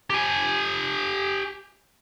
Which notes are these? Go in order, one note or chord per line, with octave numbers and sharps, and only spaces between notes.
G4 G#5